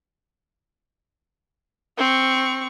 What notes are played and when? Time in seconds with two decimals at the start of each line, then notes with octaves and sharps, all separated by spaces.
1.98 C4 C#6